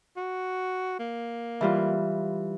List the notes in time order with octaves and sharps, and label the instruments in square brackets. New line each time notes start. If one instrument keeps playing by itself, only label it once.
[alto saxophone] F#4
A#3
[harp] E3 G3 F4